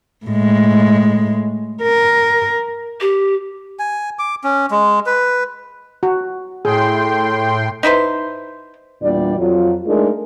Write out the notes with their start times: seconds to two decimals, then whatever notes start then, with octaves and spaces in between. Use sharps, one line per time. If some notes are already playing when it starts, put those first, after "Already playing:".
0.26 A2 G#3
1.82 A#4
3.01 G4
3.79 G#5
4.19 D6
4.44 C#4
4.71 G#3
5.06 B4
6.03 F#4
6.65 A2 G#4 G5 C6
7.83 D#4 E4 B4 C5
9.02 E2 A#2 G3 D4 D5
9.37 F2 F#3 F4
9.86 G#3 A3 D4 D#4 G#4 A#4